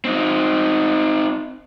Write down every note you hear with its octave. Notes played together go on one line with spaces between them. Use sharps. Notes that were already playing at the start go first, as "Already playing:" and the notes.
C4 D#4